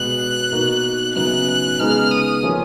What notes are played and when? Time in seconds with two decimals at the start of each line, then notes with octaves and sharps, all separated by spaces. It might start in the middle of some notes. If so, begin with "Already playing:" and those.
Already playing: B2 G#3 B3 F#6
0.52 B2 A#3 D#4 F#4 A#4
1.15 F#2 C#3 F#3 B3 D#4 F#6
1.79 C#3 G#3 B3 D#4 G#4 F6
2.11 D#6
2.43 F3 A#3 C#4